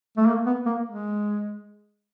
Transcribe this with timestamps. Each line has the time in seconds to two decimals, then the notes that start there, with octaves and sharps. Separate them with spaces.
0.17 A3
0.26 A#3
0.46 B3
0.66 A#3
0.86 G#3